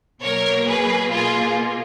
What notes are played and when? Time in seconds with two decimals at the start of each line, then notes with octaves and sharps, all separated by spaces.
0.23 B2 F#3 A#3 A#4 C#5
0.67 G#4 B4
1.11 B2 A#3 F4 G#4